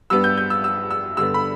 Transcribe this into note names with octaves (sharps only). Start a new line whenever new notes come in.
G2 G3 B3 E6
G6
G6
E6
E6
E6
G2 D3 B3 E6
B5